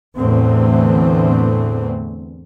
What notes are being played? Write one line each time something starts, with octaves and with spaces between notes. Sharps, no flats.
E2 A2 D3 E3 A3 C4